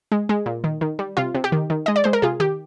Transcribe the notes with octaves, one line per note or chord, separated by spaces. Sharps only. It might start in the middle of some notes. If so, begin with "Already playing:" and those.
G#3
G#3
A#2
D#3
D#3
G3
C3 F4
C3
G4
D#3
D#3
G#3 D#5
D5
G#3 C5
A#4
C3 F4 G#4
D#3 G4